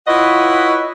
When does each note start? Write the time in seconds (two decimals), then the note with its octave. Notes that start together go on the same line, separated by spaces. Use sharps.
0.07 E4 F4 B4 C#5 D#5 F#5